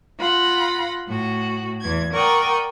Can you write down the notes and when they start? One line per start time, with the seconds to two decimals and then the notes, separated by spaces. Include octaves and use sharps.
0.19 F4 F#5 B5 A#6
1.06 A2 F#4
1.81 E2 E3 G#6
2.12 A#4 D5 F#5 G5 C#6 D#6